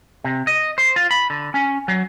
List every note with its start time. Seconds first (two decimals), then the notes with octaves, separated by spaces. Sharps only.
0.24 C3
0.47 D#5
0.78 C5
0.96 F4
1.11 B5
1.30 D3
1.54 C#4
1.88 F#3